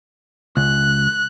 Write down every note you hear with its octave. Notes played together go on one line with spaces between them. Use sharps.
C#2 F#6